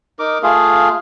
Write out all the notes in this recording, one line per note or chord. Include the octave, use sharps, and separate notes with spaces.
D#4 A#4 D6
A3 F4 G#4 F5